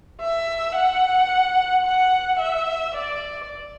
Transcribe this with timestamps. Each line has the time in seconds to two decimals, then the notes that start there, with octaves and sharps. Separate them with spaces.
0.21 E5
0.76 F#5
1.85 F#5
2.39 E5
2.94 D5